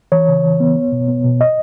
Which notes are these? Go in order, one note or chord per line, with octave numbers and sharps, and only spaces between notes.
E3 C#5
C#3
E3
B3
B3
B2
B3
B2
D#5